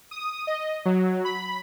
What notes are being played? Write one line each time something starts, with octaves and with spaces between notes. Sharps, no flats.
D#6
D#5
F#3
B5